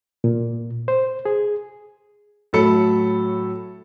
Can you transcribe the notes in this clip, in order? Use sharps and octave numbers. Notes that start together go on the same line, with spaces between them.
A#2
C5
G#4
A2 F#3 A4 B5 C#7